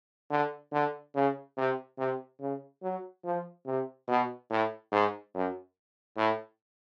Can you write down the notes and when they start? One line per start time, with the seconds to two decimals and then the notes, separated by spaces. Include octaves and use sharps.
0.30 D3
0.72 D3
1.15 C#3
1.57 C3
1.98 C3
2.40 C#3
2.83 F#3
3.24 F3
3.66 C3
4.08 B2
4.50 A2
4.92 G#2
5.34 F#2
6.17 A2